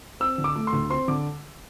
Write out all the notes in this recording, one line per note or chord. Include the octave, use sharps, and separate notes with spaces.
C4 E6
D3
D6
A3
C6
D2
C4 C6
D3 D6